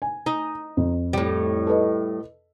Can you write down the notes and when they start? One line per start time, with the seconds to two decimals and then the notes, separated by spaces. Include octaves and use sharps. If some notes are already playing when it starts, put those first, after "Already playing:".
0.02 G#5
0.26 D#4
0.77 F2
1.13 A2 G3
1.67 A4 B4 D#5